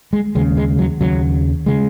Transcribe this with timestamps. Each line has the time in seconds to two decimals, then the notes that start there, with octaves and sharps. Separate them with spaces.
0.13 G#3
0.35 D#2 C#3 G#3
0.57 G#3
0.79 F#3
1.00 D#2 C#3 F#3
1.66 C#3 G#3